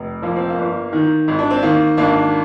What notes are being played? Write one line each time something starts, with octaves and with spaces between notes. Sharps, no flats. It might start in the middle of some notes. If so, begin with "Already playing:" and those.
Already playing: F1
F3 A#3
C4
A#3
G1
D#3
G#1
D4
C4
D#3 A#3
G#1 A#3 D4